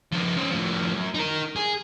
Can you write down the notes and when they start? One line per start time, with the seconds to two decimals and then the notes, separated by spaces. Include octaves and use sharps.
0.12 F3 D#4
0.37 C#4 C5
0.51 A2 F3
0.94 F#2
1.14 D#4 A#4
1.56 G#4